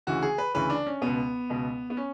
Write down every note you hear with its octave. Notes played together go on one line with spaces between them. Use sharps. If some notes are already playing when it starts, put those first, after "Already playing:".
D2 C#3 E3 F#4
G#4
B4
D2 C#3 E3 B4
D4
C#4
C#2 B2 B3
C#2 B2
B3
C#4